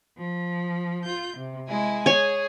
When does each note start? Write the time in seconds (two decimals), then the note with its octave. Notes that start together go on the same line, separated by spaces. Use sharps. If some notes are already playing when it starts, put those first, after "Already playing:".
0.16 F3
1.04 F4 G6
1.36 C3
1.67 G#3 E4 G#5
2.06 G#4 C#5 G#5